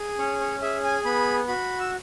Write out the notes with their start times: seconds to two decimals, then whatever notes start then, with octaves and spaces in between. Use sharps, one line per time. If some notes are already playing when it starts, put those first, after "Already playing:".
Already playing: G#4
0.19 C#4 C#5
0.41 C#5
0.62 G#4 E5
0.84 G#5
1.05 B3 B5
1.48 F#4 B5
1.80 E6